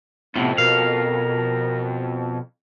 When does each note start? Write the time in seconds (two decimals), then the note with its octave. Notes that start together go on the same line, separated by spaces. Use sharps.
0.36 F2 A2 C3 B3
0.58 B2 A#4 F5